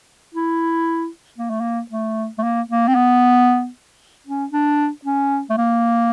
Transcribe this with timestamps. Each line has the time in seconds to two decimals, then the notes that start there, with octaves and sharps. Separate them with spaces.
0.34 E4
1.38 A#3
1.50 A3
1.61 A#3
1.91 A3
2.39 A3
2.43 A#3
2.70 A#3
2.88 C4
2.95 B3
4.27 C#4
4.52 D4
5.05 C#4
5.50 A3
5.58 A#3